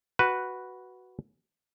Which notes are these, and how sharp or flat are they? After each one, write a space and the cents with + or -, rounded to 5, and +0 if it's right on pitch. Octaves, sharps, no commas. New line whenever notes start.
F#4 +5 B4 +0